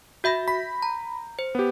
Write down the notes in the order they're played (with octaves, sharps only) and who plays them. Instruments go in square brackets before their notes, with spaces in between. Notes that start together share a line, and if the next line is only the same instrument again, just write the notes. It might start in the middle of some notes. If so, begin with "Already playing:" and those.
[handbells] F#4 E5 B5 [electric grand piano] G6 A#6
[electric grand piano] B5 [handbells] B6
[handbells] A#5
C5
[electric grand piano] B3 G4